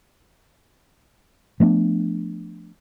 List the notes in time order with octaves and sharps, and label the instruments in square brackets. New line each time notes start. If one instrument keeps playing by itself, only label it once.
[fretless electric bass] F3 A3 B3 D4